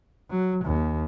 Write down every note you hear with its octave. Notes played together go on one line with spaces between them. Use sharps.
F#3
D#2